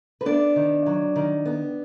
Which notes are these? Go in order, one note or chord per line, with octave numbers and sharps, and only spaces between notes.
B4
B3 D4 D5
D#3
F#3
D#3
B3